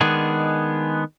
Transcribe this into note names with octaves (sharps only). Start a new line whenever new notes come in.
D#3 G#3 B3 D4 G#4